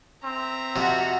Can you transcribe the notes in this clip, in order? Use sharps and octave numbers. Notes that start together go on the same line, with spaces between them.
C4 E5 A#5
F2 C3 F#4